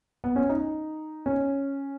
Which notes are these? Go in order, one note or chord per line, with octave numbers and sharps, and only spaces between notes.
B3
C#4
D#4
C#4